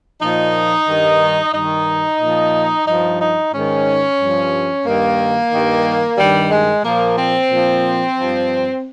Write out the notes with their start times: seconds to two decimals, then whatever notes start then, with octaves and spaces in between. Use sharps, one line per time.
0.21 A#2 F3 D#4
0.87 G2 D#3
1.53 G2 D#3 D#4
2.20 A#2 F3
2.86 G2 F3 D#4
3.19 D#4
3.52 G#2 D#3 C#4
4.19 G2 F3
4.85 G2 D#3 A#3
5.51 G2 D#3
6.18 G2 D#3 G3
6.51 G#3
6.84 A#2 F3 A#3
7.17 C4
7.50 A#2 F3
8.16 G2 F3